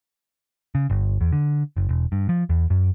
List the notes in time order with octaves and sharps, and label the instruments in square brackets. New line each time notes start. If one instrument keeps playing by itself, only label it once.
[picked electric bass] C#3
G1
E2
D3
F#1
E1
G2
F3
E2
F#2